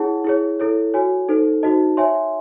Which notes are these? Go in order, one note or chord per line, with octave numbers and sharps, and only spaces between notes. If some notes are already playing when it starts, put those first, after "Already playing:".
Already playing: E4 G#4 C#5 F#5 A5
E4 G#4 C#5
E4 A4 C#5
F#4 C#5 G#5
D#4 A4 C5
D#4 F#4 C5 D#5 A5
C#5 E5 G#5 C6